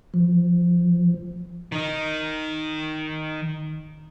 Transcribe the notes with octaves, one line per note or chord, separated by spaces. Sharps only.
F3
D#3 D#4